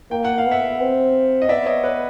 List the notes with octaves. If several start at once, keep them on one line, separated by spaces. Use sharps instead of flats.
A#3 G5
F#5
F5
B3
E5 F#5
C4
D#5
B3 D5 E5
C#5 D#5
B4 C#5